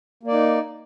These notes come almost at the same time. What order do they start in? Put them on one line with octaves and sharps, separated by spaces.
A#3 D5 D#4